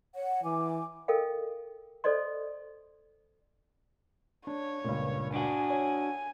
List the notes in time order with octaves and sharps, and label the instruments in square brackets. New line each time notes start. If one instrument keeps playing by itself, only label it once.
[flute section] C#5 F#5
[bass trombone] E3 [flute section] G#5 D6
[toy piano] A4 A#4 D#5 F5 G5
A4 C5 D5 D#5 C6
[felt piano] D4 [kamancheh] C#5
[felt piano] C#2 G2 A#2
[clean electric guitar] D4 F#4 [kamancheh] G#5
[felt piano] C#5